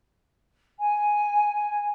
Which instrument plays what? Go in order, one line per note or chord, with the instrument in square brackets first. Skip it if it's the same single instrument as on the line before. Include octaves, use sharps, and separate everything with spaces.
[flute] G#5